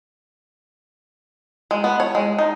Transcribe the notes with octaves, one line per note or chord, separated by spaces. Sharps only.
G#3
B3
C#5
G#3
D#4